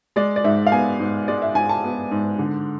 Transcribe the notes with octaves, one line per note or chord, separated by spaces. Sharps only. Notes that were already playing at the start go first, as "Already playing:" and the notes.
G#3 D5
D5
G#2 E5
F5
B3 G#5
G#2
G#3 D5
E5
G#2 G#5
A5
B3
G#2
D3